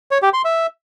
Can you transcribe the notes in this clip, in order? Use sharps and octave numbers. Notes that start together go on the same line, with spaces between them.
C#5
G4
C6
E5